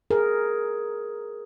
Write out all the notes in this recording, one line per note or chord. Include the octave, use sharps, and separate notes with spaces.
G#4 A#4